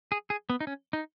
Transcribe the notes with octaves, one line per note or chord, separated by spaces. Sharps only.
G#4
G#4
B3
D#4
C#4
D#4